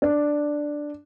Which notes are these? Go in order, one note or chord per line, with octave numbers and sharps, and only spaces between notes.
D4